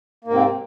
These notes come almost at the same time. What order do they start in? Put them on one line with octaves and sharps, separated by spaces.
A#3 G#2 C3 C4